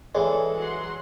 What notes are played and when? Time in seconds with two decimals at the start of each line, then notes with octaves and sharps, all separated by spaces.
0.15 E3 G#3 A4 C#5 D5 E5
0.57 F#3 F#5 C6